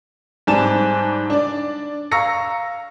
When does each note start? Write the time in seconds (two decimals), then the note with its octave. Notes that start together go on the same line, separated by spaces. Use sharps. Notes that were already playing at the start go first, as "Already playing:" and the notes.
0.47 G#2 G3 C4 G#5 A5 E7
1.30 D4 D5
2.12 F5 A#5 C#6 E6 A#6 C#7